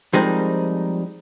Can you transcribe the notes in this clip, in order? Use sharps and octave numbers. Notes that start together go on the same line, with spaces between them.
F3 G3 G#3 C4 D#4 A#4